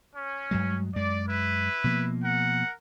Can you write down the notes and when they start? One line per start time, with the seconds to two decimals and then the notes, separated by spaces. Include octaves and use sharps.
0.16 C#4
0.51 G2 F#3 G#3
0.95 F#2 G#3 D5
1.29 E4 B4
1.84 B2 F3 A#3
2.25 A#4 F#5